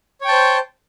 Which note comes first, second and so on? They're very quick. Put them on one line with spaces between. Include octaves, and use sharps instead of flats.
C#5 G5 A5 C5